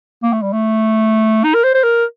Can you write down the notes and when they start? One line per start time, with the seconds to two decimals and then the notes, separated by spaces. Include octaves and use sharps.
0.23 A#3
0.32 A3
0.42 G3
0.53 A3
1.44 D#4
1.54 A#4
1.64 C5
1.74 C5
1.83 A#4